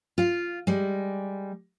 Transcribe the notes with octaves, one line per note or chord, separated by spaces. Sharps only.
F4 F5
G3 G#3